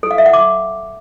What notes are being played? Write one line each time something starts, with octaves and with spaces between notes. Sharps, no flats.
A4
F5
E5
F#5
D6